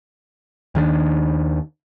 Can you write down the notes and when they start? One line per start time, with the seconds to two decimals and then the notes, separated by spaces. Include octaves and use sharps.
0.75 D#2 D#3 F3 D4